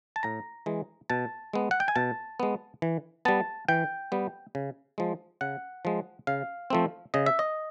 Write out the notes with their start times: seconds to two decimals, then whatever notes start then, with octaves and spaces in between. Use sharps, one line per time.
0.16 A5
0.23 A2 A#5
0.66 E3 G#3
1.10 B2 A5
1.53 G#3 B3
1.71 F#5
1.80 G5
1.88 G#5
1.96 B2 A5
2.40 G#3 B3
2.82 E3
3.25 G3 B3 A5
3.68 E3 G5
4.12 G3 B3
4.55 C#3
4.98 F3 G#3
5.41 C#3 F#5
5.85 F3 G#3
6.27 C#3 F5
6.70 F3 A3 C4
7.14 C#3 D#5
7.26 E5
7.39 D#5